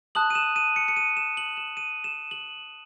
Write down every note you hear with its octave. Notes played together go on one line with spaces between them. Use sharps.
A5 D#6 F#6 F#7
D#7
E7
D#7
C#7
C#7
D#7
E7
F#7
E7
D#7
E7
F#7